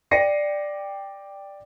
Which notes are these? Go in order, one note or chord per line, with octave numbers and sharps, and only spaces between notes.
D5 G5 A#6 C7 C#7 D#7